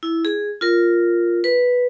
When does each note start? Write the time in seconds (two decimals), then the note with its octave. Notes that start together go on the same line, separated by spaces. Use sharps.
0.03 E4
0.25 G#4
0.61 F4 A#4
1.44 B4